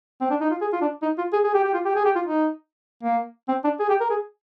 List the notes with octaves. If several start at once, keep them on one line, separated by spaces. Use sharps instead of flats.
C4
D4
D#4
F4
G#4
F4
D4
D#4
F4
G#4
G#4
G4
G4
F4
G4
G#4
G4
F4
D#4
A#3
C4
D4
G#4
G4
A#4
G#4